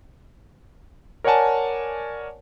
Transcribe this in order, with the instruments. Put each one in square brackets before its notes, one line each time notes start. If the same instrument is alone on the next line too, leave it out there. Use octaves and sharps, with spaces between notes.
[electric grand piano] A#4 C#5 D5 F#5 G#5 A5